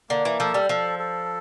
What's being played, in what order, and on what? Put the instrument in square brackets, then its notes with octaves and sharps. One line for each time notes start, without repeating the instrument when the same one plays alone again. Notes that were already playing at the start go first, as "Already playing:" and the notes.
[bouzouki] D3 [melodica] A#3
[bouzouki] E3
[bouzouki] F3 [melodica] A4
[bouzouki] G3
[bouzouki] F3 [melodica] A4
[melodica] A4